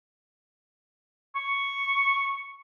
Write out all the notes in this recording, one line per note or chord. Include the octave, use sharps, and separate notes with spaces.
C#6